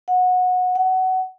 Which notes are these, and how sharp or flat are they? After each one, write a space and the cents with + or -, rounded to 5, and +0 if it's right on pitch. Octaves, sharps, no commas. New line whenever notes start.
F#5 -20
F#5 +20